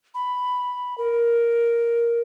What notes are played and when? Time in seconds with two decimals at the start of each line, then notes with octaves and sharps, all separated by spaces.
0.14 B5
0.98 A#4